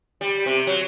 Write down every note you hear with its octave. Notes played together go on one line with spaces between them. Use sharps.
G3
C3
F#3